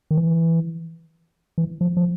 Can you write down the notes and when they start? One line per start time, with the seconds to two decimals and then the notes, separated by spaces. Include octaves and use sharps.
0.11 D#3
0.18 E3
1.58 E3
1.81 F3
1.97 F3